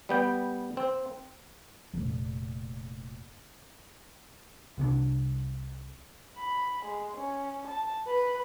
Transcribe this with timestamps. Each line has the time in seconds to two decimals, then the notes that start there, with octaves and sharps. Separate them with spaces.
0.09 G3 B3 G5
0.77 C4
1.94 F1 A#2
4.78 C2 C3 F3 D4
6.37 B5
6.85 G#3
7.17 C#4
7.67 A5
8.07 B4